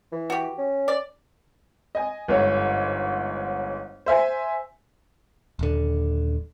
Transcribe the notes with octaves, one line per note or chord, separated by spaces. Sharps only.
E3
F#4 G4
C#4
D5
D#5 G#5
G1 G#2 C#5
C5 E5 G#5
D#1 D3